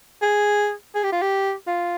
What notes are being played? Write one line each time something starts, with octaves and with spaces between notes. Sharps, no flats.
G#4
G#4
G4
F4
G4
F4